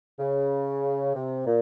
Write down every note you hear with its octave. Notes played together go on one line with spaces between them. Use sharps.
C#3
C3
A#2